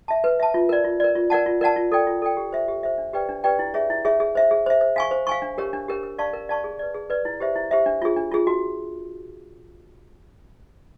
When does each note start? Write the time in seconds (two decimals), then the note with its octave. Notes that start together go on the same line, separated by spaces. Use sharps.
0.08 E5 A5
0.24 B4
0.39 E5 A5
0.54 F4
0.69 A#4 D5
0.84 F4
1.00 A#4 D5
1.15 F4
1.30 A#4 D5 F#5 A5
1.46 F4
1.61 A#4 D5 F#5 A5
1.76 F4
1.92 A4 D5 G5
2.07 F4
2.22 A4 D5 G5
2.37 G4
2.52 C5 E5
2.68 G4
2.83 C5 E5
2.98 D4
3.13 G4 B4 D5 G5
3.29 D4
3.44 G4 B4 D5 G5
3.59 E4
3.74 G#4 C#5 E5
3.90 E4
4.05 G#4 C#5 E5
4.20 G#4
4.35 C5 E5
4.51 G#4
4.66 C5 E5
4.81 C5
4.96 F5 G#5 C#6
5.11 C5
5.27 F5 G#5 C#6
5.42 D4
5.58 G4 A#4 C#5
5.73 D4
5.88 G4 A#4 C#5
6.03 A#4
6.18 D5 F5 A5 C#6
6.33 A#4
6.49 D5 F5 A5 C#6
6.64 G#4
6.79 B4 D5
6.94 G#4
7.10 B4 D5
7.25 E4
7.40 G4 C5 E5
7.56 E4
7.71 G4 C5 E5
7.86 D4
8.02 F4 G#4
8.17 D4
8.32 F4 G#4
8.47 F#4